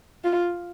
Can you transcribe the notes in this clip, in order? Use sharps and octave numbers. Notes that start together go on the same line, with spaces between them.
F4